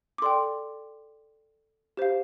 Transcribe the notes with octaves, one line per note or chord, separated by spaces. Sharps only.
D6
A4 D5 G5 C6
G4 C5 F5